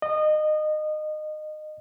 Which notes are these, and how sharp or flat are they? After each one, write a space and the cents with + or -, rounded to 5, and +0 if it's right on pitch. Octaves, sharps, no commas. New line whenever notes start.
D#5 -25